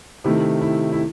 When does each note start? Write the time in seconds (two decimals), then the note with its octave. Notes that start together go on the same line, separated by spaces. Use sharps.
0.24 C3 D#3 A3 E4
0.62 E4
0.92 E4